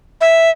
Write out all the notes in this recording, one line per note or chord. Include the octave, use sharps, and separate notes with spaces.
E5